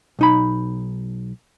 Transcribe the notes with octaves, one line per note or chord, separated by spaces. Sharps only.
B1 D#4 B5